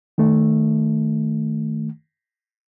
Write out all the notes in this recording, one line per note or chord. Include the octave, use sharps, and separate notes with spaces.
D#3 A3